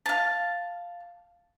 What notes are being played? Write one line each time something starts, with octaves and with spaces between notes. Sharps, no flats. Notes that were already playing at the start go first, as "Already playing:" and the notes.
F5 A5